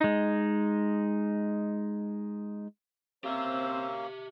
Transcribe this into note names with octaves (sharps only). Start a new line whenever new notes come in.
G#3 D#4
A#3 C4 C#4 G4 C5 E5 E6